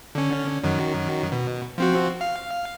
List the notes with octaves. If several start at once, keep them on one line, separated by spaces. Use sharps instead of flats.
D3 C#4
F#2 D#3 F#3
B2
F3 C4 F#4
F5